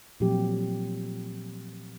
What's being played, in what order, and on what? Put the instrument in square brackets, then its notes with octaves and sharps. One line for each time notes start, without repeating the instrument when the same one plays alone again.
[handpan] A#2 F3 F#3 A3 C4 G4